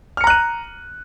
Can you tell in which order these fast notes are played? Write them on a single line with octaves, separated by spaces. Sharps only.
F6 C#7 A#5 F#6 D#7